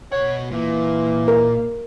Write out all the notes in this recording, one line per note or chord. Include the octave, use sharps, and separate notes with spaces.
B2 C#5 F#5
A#2 E3 A#3
A#4